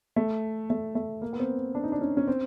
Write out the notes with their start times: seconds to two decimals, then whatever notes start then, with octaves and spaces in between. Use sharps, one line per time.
0.16 A3
0.70 A3
0.95 A3
1.22 A#3
1.33 B3
1.40 C4
1.75 D4
1.83 D#4
1.92 D4
2.01 C#4
2.17 C#4
2.27 C4